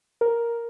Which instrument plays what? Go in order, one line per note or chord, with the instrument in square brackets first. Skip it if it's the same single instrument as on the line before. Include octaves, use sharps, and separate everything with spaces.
[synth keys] A#4